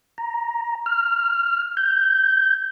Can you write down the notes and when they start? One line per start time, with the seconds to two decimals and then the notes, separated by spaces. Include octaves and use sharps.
0.18 A#5
0.86 F6
1.77 G6